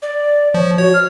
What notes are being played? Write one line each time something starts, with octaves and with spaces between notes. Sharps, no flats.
D5
F3 C#5
F#4 C#5
F6